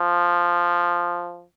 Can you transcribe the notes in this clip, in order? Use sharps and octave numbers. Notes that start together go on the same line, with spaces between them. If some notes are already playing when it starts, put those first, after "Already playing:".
Already playing: F3